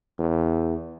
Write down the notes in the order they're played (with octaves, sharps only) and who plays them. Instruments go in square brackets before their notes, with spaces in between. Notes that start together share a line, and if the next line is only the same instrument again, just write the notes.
[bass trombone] E2